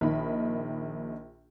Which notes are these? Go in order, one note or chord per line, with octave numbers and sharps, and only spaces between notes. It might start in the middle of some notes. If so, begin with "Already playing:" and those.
A#1 D#3 A#3 D#4 B5